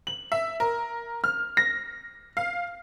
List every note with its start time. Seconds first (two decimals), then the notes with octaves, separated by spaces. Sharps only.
0.07 F#7
0.32 E5
0.60 A#4
1.24 F6
1.57 A#6
2.37 F5